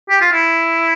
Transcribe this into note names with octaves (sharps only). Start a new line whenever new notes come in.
G4
F4
E4